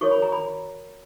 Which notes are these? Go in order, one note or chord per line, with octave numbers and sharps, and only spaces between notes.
F#4 A#4 C#5 C#6
B5
A#5
B5